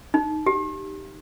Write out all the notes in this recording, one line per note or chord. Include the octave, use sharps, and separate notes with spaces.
D#4
G4